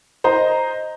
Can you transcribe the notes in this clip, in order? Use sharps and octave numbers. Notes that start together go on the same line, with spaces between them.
C5 D#5 A#5